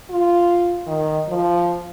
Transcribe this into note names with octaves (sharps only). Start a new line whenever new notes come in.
F4
D#3
F3